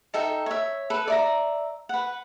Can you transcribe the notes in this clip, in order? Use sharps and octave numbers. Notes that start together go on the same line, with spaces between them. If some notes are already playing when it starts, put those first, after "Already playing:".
D#4 A4 E5 G5
C#5 E5
A4 B4
D5 E5 A#5
B4 F#5